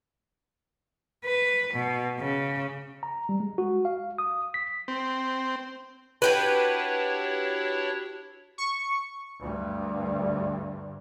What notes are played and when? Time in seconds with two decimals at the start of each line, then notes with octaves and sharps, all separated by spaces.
1.25 B4
1.73 B2
2.20 C#3
3.03 A#5
3.29 G3
3.40 G#3
3.58 F#4
3.85 F5
4.18 D#6
4.54 B6
4.88 C4
6.22 D4 E4 F#4 G4 B4 C#5
8.58 C#6
9.40 D2 G2